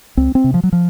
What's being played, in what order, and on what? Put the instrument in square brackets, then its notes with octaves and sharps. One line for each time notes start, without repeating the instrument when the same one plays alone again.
[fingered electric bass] C#2 C4
C4
C3
F3
F#3
F3